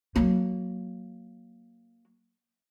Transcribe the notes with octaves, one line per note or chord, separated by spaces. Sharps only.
F#3 A#3